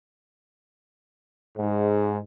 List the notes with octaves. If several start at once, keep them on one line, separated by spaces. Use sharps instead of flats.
G#2